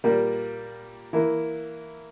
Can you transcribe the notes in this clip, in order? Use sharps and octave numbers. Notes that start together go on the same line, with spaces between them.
A#2 G3 A#3
E3 A#3 E4